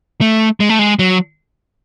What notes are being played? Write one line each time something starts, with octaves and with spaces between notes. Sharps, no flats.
A3
G#3
A3
G#3
F#3